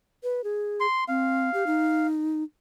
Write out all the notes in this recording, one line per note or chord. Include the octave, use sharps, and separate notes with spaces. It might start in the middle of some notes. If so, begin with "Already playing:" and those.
B4
G#4
C6
C4 F5
G4
D#4